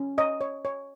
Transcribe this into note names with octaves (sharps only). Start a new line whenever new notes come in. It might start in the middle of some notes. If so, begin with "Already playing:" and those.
Already playing: C#4
C#5 D#5
C#5
C#5